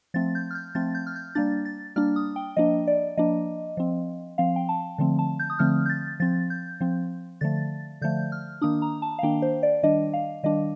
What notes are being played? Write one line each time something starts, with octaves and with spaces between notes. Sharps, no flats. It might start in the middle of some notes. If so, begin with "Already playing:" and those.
F3 A3 C4 A6
G6
F6
G6
F3 A3 C4 A6
G6
F6
G6
G3 A#3 D4 A6
A6
G3 A#3 D4 F6
D#6
G5
F3 A#3 D4 D#5
D5
F3 A#3 D4 D#5
F3 C4
F3 C4 F5
G5
A5
D3 F3 A3 C4
A5
G6
D#6
D3 F3 A3 C4 F6
G6
A6
F3 C4 A6
G6
F3 C4
D3 F3 A3 A6
D3 F3 A3 G6
F6
D#3 A#3 D4 D#6
A#5
A5
F5
D#3 A#3 D4 G5
C5
D5
D#3 G3 D4 D#5
F5
D#3 G3 D4 D#5